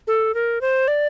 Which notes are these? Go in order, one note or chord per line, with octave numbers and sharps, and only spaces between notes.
A4
A#4
C5
D5